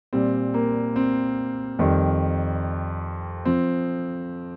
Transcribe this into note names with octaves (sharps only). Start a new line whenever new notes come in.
A#2 G3 C4
A#3
C4
F2 D#3 G3
F3 C4